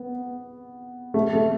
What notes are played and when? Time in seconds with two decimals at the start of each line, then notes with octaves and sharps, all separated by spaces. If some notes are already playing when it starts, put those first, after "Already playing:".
Already playing: B3
1.14 A3
1.33 A3